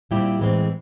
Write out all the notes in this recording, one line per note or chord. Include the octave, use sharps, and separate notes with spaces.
A#2 G3 C4 E4 G4
A2 E3 G#3 C4